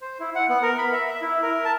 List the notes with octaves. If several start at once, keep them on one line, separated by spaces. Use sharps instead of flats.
C5
E4
F#5
B3
A#4
B5
E5
E5
E4
A#4
A5